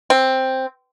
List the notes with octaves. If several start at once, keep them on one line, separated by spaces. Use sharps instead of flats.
C4